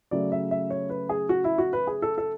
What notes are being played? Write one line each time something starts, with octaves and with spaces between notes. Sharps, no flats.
C#3 F#3 A3 D5
E5
E5
C#5
B4
G#4
F#4
E4
F#4
B4
G#4
A4
A4